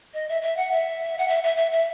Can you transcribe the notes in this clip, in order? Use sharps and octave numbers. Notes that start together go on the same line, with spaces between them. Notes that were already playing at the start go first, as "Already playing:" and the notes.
D#5
E5
E5
F#5
E5
F#5
E5
E5
E5
E5